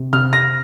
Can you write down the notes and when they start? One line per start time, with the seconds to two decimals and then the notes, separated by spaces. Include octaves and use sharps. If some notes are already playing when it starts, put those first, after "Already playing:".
Already playing: C3
0.13 C3 F6
0.33 A#6